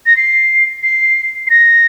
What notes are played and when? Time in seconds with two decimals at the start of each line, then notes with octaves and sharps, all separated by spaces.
0.06 A#6
0.17 C7
0.83 C7
1.47 C7
1.50 A#6